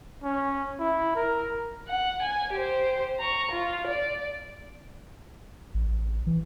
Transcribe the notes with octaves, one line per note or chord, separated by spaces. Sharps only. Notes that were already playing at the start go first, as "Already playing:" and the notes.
C#4
E4
A#4
F#5
G#5
G4 C5
A#5 C#6
F4
D5
A1
E3